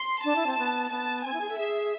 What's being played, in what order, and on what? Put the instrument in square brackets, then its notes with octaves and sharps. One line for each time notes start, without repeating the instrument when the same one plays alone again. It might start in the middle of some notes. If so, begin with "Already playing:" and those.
Already playing: [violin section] C6
[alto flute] D4 [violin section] A5
[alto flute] E4
C4
B3
[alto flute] B3 [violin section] A5
[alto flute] C4 [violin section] G#5
[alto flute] E4
G#4
A4
[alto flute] G#4 [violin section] E5